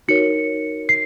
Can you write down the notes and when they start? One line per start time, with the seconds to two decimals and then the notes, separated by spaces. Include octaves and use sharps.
0.08 D#4 F#4 A#4 C#5 C#7
0.89 C7